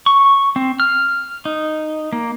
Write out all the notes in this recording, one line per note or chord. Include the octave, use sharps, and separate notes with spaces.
C#6
C4
F6
D#4
A#3